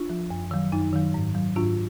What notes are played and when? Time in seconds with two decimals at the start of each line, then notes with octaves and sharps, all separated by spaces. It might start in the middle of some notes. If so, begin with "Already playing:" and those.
Already playing: D4 F4
0.09 F3
0.30 F#2
0.51 D#3 F#3
0.72 F#2 D#4
0.93 D#3 F#3
1.14 G#2
1.35 F#3
1.56 G#2 D4 F4